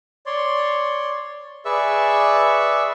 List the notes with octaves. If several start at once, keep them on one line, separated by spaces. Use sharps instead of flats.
C#5 D5 C6
G#4 B4 D5 E5 C#6 E6